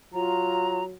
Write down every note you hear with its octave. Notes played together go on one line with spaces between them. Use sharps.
F#3 F4 A#5